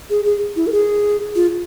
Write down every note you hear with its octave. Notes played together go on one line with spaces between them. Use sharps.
G#4
G#4
E4
A#4
G#4
F4